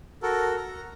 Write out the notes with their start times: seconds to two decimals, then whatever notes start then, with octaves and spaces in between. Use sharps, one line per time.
0.23 F#4 A4 A#4
0.57 A#5